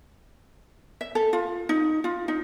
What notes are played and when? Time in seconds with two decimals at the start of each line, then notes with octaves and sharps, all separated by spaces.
1.01 E5
1.15 A4
1.33 F4
1.69 D#4
2.04 F4
2.28 D#4